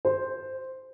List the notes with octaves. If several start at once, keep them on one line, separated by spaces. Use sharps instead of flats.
C5